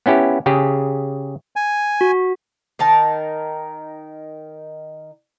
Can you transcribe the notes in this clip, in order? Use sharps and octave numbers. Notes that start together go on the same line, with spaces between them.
B3 C#4 E4 G4
C#3 G4 G#4
G#5
F#4
D#3 D#4 A#4 A5